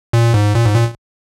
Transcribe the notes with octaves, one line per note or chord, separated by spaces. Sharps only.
A#2
G#2
A#2
G#2
A#2